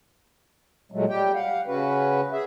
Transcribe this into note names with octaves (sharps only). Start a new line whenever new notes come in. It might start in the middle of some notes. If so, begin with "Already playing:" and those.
A#2 F#3 G#3 A3
G3 G4 G5
F5 F#5
C#3 C#4 F#4 B4
G#4 E5